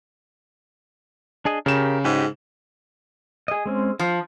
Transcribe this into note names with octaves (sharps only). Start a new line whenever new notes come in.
D4 G#4 D#5
C#3 G4 A#4 E7
G#2 F#4 G4 D#5
G#4 D#5
G#3 C4 C#4
F3 A5